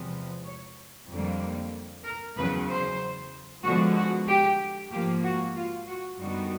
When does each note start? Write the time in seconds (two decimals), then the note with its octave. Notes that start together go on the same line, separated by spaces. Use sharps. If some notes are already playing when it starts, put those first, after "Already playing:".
Already playing: E2 C3 F3 G#3 B3
0.45 C#5
1.09 F2 D3 G3 A#3
2.04 A#4
2.37 E2 C#3 F#3 B4
2.69 C5
3.64 D3 F3 G#3 B3 F#4
3.96 F#4
4.28 G4
4.91 G#2 F3 A#3 G4
5.24 F#4
5.56 F4
5.88 F#4
6.19 F#2 D3 G3 B3 D#4 F#4